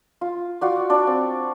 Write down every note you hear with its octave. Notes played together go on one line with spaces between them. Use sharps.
F4
F4 F#4 D5
D4 D5
C4